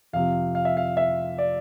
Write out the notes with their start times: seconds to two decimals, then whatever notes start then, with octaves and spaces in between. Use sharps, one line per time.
0.13 F2 C3 F3 F5
0.55 F5
0.65 E5
0.77 F5
0.97 E5
1.38 D5